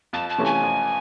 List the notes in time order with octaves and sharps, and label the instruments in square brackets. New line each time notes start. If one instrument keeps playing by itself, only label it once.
[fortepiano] F2 [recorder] A5
[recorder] A5
[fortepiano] C3 E3 A3 C#4
[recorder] G#5
[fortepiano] F2